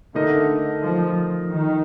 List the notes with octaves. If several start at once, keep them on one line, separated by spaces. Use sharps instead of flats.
D3 A3 D#4 A#4 D#5
F3
D#3